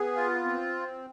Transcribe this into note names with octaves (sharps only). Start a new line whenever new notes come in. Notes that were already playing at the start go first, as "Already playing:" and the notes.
Already playing: B3 G#4
F4
C4